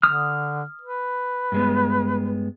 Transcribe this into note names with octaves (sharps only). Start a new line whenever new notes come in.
D3 D#6 F6
B4
G2 G#3 B3